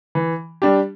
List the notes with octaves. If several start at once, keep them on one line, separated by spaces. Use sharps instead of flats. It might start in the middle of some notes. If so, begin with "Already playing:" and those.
E3
G3 D4 G4